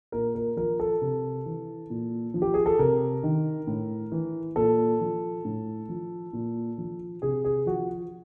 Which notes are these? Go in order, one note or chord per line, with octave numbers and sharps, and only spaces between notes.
A#2 A#4
A#4
F3 A#4
A4
C3
E3
A#2
F3
G4
G#4
A4
C3 A#4
D#3
A2
E3
A#2 A4
F3
A2
F3
A#2
F3
C3 G#4
G#4
F3 F#4